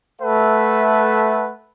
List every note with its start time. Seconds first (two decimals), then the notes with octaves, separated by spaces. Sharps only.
0.21 A3 A4 B4 E5 F#5